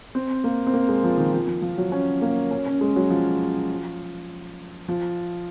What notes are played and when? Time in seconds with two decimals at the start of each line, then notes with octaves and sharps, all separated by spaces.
0.15 C4
0.44 A#3
0.67 C4
0.73 A#3
0.89 G#3
1.04 F3
1.17 D#3
1.33 F3
1.47 F3
1.62 F3
1.78 F#3
1.92 C#4
2.22 A#3
2.51 C#4
2.66 C#4
2.81 G#3
2.96 F#3
3.10 F3
4.88 F3